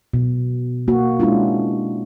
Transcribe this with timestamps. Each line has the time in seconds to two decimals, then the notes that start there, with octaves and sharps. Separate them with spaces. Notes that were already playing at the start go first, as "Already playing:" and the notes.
0.14 B2
0.88 A#3 F#4
1.20 G#3 C#4 D4 E4 F4